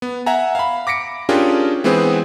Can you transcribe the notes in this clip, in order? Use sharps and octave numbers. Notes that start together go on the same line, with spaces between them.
B3
E5 F#5 G#5 A#5
F5 B5
D6 A#6 B6 C#7 D7
C#4 D4 F4 G4 G#4 A#4
E3 G#3 B3 C4 G#4 C5